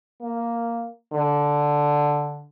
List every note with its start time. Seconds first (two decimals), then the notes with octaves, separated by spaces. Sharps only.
0.22 A#3
1.13 D3